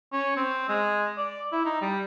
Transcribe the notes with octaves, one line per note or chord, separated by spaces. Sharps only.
C#4
C4
G#3
D5
E4
D#4
G3